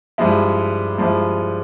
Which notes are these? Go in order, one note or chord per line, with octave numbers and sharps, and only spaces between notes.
G2 F3 G#3 E4
G2 F3 G#3 E4